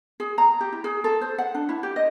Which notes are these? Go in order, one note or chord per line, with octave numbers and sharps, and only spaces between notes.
G#4
A#5
G4
E4
G#4
A4
C5
F#5
D4
E4
G4
D#5